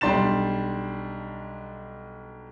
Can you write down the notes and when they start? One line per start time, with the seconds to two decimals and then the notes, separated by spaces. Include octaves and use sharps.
0.01 B1 G3 D4 C6 A6 E7